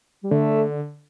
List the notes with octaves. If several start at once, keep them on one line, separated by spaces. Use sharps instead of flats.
G3
D3 A3